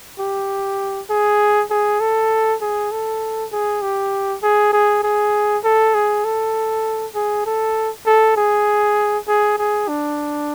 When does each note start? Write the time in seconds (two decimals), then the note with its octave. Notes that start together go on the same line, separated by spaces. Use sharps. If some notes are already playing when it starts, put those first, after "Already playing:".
0.20 G4
1.10 G#4
1.71 G#4
2.01 A4
2.62 G#4
2.92 A4
3.52 G#4
3.82 G4
4.43 G#4
4.73 G#4
5.04 G#4
5.64 A4
5.95 G#4
6.25 A4
7.15 G#4
7.46 A4
8.07 A4
8.37 G#4
9.28 G#4
9.58 G#4
9.88 D4